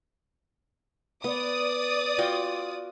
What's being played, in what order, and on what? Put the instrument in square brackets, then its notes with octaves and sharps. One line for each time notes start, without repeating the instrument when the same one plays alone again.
[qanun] B3 [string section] D5 D#6
[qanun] F4 F#4 G5